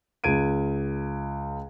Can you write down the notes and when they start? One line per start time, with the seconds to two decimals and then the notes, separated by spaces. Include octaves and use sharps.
0.24 C#2 G#6 D7 D#7